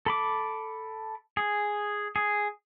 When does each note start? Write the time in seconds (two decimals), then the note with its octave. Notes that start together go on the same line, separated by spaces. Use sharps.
0.06 A4 B5 D6
1.37 G#4
2.16 G#4